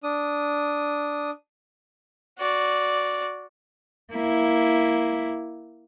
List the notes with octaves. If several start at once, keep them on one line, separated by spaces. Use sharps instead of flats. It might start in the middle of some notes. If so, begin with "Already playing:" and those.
D4 D#6
F#4 D5
A#3 E4